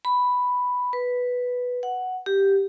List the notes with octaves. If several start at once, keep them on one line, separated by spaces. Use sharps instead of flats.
B5
B4
F#5
G4